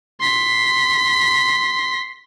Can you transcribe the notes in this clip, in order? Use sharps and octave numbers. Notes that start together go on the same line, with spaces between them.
C6 B6